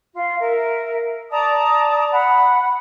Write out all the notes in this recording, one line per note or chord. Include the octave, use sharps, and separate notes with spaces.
F4
A#4 E5
D5 A5 A#5 D#6
F#5 B5